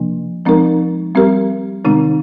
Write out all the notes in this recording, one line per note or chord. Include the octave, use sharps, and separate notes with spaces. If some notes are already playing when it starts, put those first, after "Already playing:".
Already playing: C3 F3 A#3 D4
F3 G#3 C4 D#4 A#4
G3 C4 G4 A#4
C3 D#3 G#3 C4 D#4